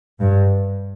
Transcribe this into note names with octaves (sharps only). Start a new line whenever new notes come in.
G2